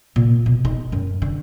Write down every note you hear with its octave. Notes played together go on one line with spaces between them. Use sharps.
A#2
B2
D#4
F#2
D3